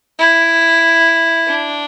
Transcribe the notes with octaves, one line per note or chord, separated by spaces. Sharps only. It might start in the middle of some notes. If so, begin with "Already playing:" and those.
E4
D4